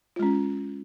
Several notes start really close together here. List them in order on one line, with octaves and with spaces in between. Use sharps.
F4 G#3 C#4